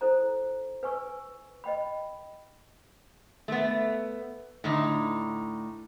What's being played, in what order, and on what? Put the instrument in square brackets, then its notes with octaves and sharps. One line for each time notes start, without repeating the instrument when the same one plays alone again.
[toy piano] E4 A4 C5 A#5
B4 G#5 C#6 E6
D#5 G5 B5
[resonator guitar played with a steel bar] A3 B3
A2 D3 D#4